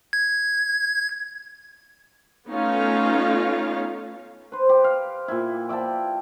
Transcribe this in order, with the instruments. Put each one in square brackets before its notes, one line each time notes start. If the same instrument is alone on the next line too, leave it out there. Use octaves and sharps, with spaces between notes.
[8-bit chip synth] G#6
[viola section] A3 B3 C#4 D#4 F4 F5
[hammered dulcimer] B4 C5
G4
F5
A#2 E4
D5 E5 G5 A5